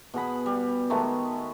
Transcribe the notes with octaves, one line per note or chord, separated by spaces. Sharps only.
B2 G#4 F#5 B5
G3
D#3 G#3 A3 B3